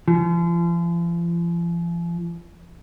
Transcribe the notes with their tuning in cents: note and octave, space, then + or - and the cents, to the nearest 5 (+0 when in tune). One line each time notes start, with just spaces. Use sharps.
F3 -40